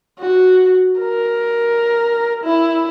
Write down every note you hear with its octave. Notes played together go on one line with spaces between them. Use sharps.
F#4
A#4
E4